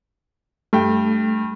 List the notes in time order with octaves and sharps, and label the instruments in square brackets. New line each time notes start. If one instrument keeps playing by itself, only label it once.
[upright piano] G2 G5 [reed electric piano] A3